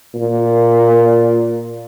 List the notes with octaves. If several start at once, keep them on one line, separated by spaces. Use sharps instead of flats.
A#2